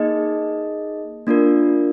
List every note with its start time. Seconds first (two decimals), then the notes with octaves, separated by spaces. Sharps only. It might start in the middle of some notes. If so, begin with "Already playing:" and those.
Already playing: A#3 D#4 G#4 D#5
1.27 A#3 D4 F4 A#4